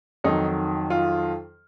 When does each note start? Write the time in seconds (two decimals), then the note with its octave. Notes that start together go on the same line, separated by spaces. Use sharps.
0.24 F2 D#3 F#3 D#4
0.90 F4